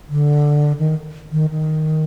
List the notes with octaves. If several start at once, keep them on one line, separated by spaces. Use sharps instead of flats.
D3
D#3
D#3
D#3